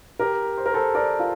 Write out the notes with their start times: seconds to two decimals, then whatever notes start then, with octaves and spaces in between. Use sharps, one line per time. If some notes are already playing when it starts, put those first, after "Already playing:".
0.20 G4 A#4
0.58 C5
0.66 A#4
0.74 A4 C5
0.95 A#4 D5
1.19 F4